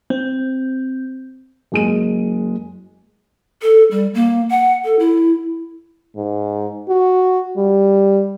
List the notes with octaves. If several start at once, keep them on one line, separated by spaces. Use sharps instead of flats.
C4
F#1 G#3 D#7
A4
G3
A#3
F#5
A4
E4
G#2
F#4
G3